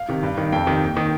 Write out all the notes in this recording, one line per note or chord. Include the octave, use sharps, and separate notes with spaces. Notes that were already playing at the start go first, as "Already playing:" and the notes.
Already playing: F5
C3 D#3
G2
D#3
F2 G5
C3 D#3
D#2
D#3